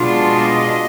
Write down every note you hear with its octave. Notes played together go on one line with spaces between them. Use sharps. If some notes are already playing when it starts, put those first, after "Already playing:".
Already playing: B2 G#3 D4 F4
D#5